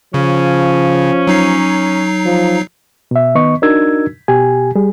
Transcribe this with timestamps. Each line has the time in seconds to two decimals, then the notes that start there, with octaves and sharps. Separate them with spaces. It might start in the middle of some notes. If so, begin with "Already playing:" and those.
0.14 C#3 F3 C#4
1.27 F#3 D#4 C7
2.26 F3
3.11 B2 E5
3.35 D#3 B3 D#5 C#6
3.62 D4 D#4 F#4 A#4 E6 G#6
4.28 B2 G4 G#5
4.75 G3 G#4